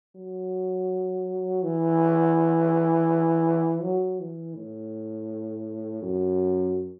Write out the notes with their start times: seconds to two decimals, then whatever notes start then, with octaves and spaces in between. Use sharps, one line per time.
0.15 F#3
1.63 E3
3.82 F#3
4.20 E3
4.55 A2
6.02 F#2